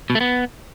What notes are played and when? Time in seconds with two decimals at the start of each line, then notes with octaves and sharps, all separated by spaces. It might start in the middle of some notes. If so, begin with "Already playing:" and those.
0.10 B2
0.15 A3
0.21 B3